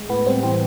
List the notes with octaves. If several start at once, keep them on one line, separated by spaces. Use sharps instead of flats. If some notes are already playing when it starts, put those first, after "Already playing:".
Already playing: G#3
A2 B3
G3 C4
E3 C4